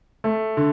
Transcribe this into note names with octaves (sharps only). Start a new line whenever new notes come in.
A3
D3